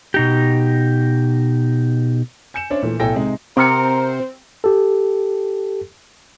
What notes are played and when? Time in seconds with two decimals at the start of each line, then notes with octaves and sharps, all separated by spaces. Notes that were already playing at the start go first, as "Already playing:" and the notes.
0.14 B2 D#4 G4
2.54 G#5 G6 C#7 E7
2.70 C#4 D4 C5 C#5 E5
2.82 A#2 E3 A3
3.00 B1 A2 A4 G5 G#5 A#6
3.15 C3 G#3 D#4
3.57 C3 C4 A#4 F#5 F6 C#7
4.64 G4 A4